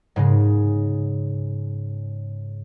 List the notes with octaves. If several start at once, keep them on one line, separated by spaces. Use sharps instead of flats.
G#2 C#3 G#3